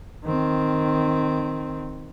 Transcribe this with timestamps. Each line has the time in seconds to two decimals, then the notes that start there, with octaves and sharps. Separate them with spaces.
0.24 D#3 C4